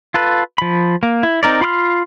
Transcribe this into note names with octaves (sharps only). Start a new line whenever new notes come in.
F4 A4 B4
F3 B5
A#3
E4
C4 D#4 A#4 D5
F4 B5 C6 D6 F6